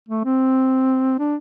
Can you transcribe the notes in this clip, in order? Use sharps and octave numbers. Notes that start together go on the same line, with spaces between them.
A3
C4
D4